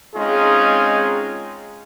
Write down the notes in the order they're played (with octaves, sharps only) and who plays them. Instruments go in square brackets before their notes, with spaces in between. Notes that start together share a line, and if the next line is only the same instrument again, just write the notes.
[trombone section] G#3 C4 C#4 D#4 F4 G#4